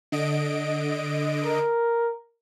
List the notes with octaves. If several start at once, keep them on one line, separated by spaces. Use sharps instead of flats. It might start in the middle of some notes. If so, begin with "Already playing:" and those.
D3 D#5 D7
A#4